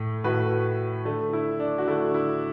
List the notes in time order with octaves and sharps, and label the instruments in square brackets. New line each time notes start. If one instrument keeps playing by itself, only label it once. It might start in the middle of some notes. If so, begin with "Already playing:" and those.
Already playing: [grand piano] A2 A3
A2 A3 F#4 B4
D3 A3
E4
D4
F#4
D3 A3 E4
E4